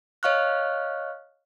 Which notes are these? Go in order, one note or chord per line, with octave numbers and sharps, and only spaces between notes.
C#5 D#5 F5 C#6 F6 F#6